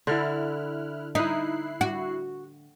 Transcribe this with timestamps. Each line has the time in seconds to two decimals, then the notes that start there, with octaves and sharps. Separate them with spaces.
0.07 D3 E4 F6 F#6
1.15 D#4 E4 F#6 C7
1.81 F#4